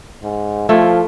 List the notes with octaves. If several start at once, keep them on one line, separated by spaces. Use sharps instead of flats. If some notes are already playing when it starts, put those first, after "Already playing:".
G#2
F3 A3 E4 F4